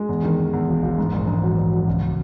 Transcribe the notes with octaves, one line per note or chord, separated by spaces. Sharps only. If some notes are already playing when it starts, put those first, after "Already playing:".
Already playing: G#3
E2
D#3
E2
E2
E1
E1
G#2
A#1
G#2
F#3
A#1
F#3
C#2